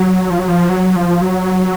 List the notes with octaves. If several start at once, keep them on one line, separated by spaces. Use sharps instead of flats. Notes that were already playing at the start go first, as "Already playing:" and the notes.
Already playing: F#3
F3
F#3
F3
F#3
F3
F#3